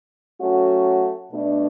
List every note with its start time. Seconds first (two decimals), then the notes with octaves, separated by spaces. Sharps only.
0.41 F#3 A3 C#4 F#4
1.31 B2 A3 D4